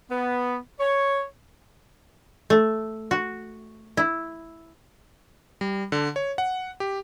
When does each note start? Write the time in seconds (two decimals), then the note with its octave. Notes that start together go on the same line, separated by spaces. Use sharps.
0.11 B3
0.80 C#5
2.50 A3
3.11 F#4
3.97 E4
5.61 G3
5.92 D3
6.16 C#5
6.38 F#5
6.80 G4